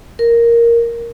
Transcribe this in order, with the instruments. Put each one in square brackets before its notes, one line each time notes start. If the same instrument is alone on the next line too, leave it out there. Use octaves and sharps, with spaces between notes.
[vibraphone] A#4